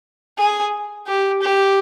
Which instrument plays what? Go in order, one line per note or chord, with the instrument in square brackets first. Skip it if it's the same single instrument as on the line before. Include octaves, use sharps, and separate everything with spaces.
[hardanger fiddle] G#4
G4
G4